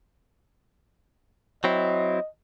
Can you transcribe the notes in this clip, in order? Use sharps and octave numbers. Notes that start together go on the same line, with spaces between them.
F#3 C4 E4 D#5